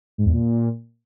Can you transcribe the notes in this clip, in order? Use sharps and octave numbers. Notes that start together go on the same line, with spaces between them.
G#2
E2
A#2